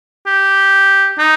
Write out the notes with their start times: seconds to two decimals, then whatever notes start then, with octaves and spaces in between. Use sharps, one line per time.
0.26 G4
1.19 D#4